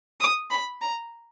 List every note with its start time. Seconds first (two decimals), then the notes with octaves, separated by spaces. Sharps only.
0.21 D#6
0.51 B5
0.81 A#5